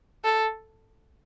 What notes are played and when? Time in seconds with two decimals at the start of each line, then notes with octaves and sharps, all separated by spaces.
0.24 A4